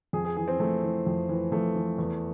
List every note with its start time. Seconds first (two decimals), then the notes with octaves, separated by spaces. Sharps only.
0.13 F2 G#4
0.25 G#4
0.37 E3 G#4
0.48 C4
0.60 F2 A3
0.83 E3
1.06 F2
1.29 E3
1.52 F2 A3
1.76 E3
1.98 E2